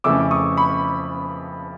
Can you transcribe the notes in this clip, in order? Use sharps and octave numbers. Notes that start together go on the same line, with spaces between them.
F2 C#3 E3 A3 C#4 D6 E6
C#6 D#6
B5 C#6